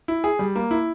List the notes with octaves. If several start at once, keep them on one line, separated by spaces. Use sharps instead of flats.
E4
G#4
G3
A#3
E4